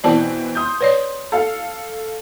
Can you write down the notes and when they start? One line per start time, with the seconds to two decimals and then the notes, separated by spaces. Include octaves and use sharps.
0.04 B2 E3 C4 D5 A5
0.55 C6 D#6 G6
0.81 B4 C#5 D5
1.32 A4 F5